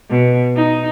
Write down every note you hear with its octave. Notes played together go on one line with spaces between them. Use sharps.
B2
D#4